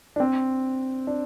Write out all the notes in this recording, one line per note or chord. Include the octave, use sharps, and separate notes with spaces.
D4
C4
D4